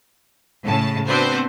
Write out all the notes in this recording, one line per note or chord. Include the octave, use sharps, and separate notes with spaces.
A2 C#3 A5
B3 C4 D4 F#4 B4 C5